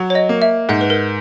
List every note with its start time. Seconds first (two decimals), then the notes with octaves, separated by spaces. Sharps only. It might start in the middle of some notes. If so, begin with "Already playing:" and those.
Already playing: F#3
0.10 C#5
0.15 D#5
0.29 A#3
0.42 E5
0.69 G#2 F#5
0.81 B4
0.90 A#4